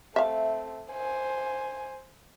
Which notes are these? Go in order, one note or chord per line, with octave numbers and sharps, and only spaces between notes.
A3 C4 E5 F5
C5 G#5